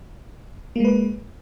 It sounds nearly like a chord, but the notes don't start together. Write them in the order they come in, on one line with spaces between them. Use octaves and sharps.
A#3 G#3 B4